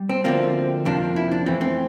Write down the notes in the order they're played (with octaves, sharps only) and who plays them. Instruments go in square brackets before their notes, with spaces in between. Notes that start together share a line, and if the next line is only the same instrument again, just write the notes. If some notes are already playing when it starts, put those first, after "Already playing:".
Already playing: [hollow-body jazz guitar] G3
C4
D2 D3 F3 A#3 C4
F2 C3 F3 A#3 D4
E4
D4
F2 E3 A3 C4
C4